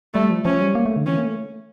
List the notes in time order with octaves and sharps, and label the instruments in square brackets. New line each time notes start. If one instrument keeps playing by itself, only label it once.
[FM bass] G3 [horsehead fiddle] A3
[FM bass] F3
[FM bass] F3 [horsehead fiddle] C#4
[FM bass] G3
A#3
A3
D3
[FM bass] E3 [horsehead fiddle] C#4
[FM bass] A#3
A3